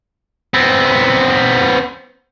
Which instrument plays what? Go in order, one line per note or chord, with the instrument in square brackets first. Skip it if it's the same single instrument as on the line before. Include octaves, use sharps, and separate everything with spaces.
[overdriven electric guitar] B3 C4